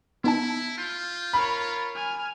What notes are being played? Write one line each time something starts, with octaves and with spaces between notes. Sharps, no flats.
B3 D#4 E4 A5
F4 G6
A#4 C#5 B5
G#5 F6